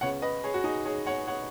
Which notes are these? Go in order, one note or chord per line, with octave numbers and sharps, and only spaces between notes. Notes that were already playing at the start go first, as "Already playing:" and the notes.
C#2 C#3 B3 C#5 F#5
B4 D#5
G#4 C#5
F#4
D#4 G#4
G#4 C#5
C#5 F#5
C#5 F#5